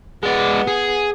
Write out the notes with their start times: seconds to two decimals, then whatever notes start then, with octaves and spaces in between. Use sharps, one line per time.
0.23 G#3 B3 D5
0.67 G#4